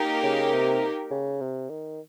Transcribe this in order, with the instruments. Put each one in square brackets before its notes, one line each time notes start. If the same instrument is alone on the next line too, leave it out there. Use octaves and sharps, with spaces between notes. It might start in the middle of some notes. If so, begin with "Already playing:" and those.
Already playing: [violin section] A#3 D#4 G4 A#4
[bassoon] C#3
C3
C#3
C3
D#3